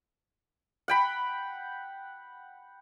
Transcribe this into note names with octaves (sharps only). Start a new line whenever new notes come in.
F#5 G5 B5